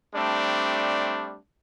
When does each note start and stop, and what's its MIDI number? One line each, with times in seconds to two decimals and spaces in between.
0.15 1.39 55
0.15 1.39 57
0.15 1.39 60
0.15 1.39 62